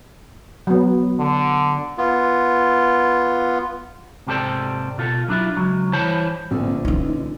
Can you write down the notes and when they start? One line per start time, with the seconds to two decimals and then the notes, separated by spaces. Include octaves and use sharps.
0.67 F#3 B3
1.19 D3
1.98 B3 F4
4.27 G#2 C3 G4 A4 C5 D5
4.98 B2 F4 A4
5.28 F#3 D4 E4 F4
5.57 C#2 F#3
5.93 G2 E3 C5 C#5 A5 B5
6.51 A#1 A#2 D3 B3 C4
6.85 E3 C#4 D#4